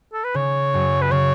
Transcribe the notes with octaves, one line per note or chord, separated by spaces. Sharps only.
A4
B4
C#3 C#5
F#2
B4
C#3 C#5